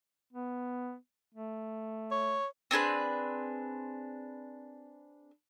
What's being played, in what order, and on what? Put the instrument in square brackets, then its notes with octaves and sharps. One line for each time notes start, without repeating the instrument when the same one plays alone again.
[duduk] B3
A3
[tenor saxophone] C#5
[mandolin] C4 D4 G#4 B4